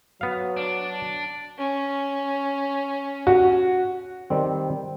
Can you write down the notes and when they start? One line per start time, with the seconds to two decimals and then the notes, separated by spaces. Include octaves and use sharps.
0.21 F#3 B3 F5
0.57 D4
1.58 C#4
3.27 F#4
4.30 D#3 G3 C4